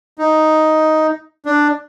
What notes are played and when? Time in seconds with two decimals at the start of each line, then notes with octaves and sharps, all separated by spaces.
0.18 D#4
1.45 D4